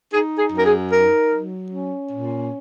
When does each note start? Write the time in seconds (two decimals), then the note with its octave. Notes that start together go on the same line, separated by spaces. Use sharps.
0.12 D#4 G#4
0.39 G#4
0.52 F#2
0.59 A#4
0.66 G#4
0.93 D#4 A#4
1.33 F#3
1.73 C#4
2.12 A#2